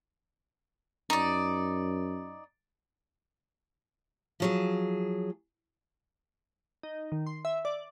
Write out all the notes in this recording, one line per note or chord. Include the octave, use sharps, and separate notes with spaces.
F#2 D#4 D5
F3 F#3 G#4
D#4
D#3
C6
E5
D5